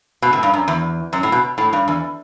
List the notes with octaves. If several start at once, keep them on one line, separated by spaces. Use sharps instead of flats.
B2
A2
G2
F#2
E2
F#2
A2
B2
A2
G2
E2